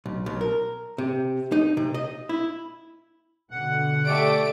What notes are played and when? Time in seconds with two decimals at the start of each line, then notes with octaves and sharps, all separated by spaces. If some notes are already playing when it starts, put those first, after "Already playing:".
0.06 B1
0.26 B1
0.41 A#4
0.98 C3
1.52 D#4
1.77 C3
1.94 D#5
2.29 E4
3.51 B2 D3 F#5
4.06 A3 G4 D5 D7